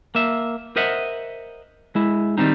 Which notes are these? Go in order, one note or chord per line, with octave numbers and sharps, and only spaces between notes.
A#3 E5
A#4 C5 D#5 E5 F#5
G#3 E4
D#3 G3 A3 C4 D#4